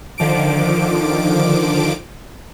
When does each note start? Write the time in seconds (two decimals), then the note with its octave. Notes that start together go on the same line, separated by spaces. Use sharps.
0.18 D3 D#3 F3 D6 D7